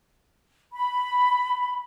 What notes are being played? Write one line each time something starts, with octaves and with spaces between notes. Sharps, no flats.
B5